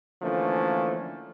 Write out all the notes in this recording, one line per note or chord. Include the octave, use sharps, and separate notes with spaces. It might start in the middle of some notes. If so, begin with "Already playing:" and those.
D3 E3 F3 A3 A#3 C#4